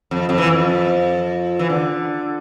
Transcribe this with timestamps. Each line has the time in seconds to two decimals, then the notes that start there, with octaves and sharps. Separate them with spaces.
0.11 F2
0.29 F2
0.38 E3
0.48 F2
1.59 E3
1.70 D3